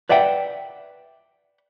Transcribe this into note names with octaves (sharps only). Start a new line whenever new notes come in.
B4 D5 E5 F#5 G5